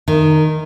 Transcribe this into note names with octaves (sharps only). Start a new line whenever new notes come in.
D#3